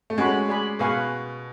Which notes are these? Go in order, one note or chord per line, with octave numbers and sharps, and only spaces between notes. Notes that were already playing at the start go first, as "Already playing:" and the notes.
A3
G#3 C#4 F#4 C#5 F#5 B5
G#4 D5 G#5 B5
B2 G#4 B4 F5 G#5 C#6